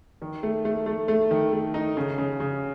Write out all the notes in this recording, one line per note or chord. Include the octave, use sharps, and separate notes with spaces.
D#3
A3
A3
A3
A3
D#3
A3
D#4
C#3
C#3
C#3